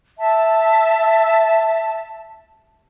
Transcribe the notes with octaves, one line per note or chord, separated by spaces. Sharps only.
E5 A5